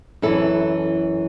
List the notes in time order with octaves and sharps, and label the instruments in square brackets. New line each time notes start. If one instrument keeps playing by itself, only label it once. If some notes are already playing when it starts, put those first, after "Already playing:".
[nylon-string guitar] F#2 E3 E4 A4